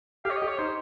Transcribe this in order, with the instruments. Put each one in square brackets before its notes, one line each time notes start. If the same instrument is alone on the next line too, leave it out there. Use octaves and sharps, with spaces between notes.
[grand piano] G4 [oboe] F5
[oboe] C#5
D#5
[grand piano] G4
[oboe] C#5
[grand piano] D#4 [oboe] C5